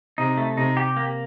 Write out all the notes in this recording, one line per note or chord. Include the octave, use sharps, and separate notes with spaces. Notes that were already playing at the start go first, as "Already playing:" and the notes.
C3 D#4
A3
C3 D#4
G4
A#3